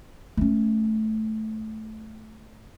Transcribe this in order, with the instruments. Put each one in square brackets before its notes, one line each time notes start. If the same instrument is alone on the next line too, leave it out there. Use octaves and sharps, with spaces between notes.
[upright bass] A3 C#4